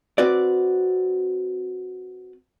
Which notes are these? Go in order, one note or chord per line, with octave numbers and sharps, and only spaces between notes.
C4 F#4 B4 D5